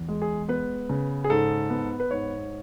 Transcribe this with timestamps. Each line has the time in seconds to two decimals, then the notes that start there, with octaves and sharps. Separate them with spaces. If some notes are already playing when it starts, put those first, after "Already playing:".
Already playing: E2
0.08 G#3
0.22 G#4
0.49 B3 B4
0.89 C#3
1.24 G#4
1.30 G#2 A4
1.70 B3
2.00 B4
2.11 G#2 C#5